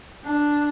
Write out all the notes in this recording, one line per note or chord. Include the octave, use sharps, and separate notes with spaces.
D4